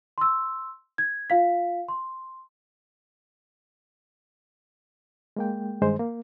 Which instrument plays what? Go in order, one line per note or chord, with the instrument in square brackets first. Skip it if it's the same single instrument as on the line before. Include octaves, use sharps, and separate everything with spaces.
[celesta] C6 E6
G#6
F4 F5 B6
C6
[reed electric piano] G#3 A#3 G5
G2 D#3 G#3 C5
A#3